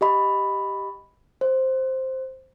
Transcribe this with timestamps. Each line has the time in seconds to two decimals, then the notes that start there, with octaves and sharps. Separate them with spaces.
0.01 G4 D#5 B5
1.41 C5